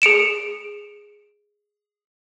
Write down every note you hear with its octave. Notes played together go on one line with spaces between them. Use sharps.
G#4 C#7 D7 E7